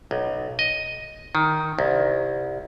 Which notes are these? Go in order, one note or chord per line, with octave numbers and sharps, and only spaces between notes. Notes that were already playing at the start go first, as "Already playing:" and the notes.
B1
D#5
D#3
C2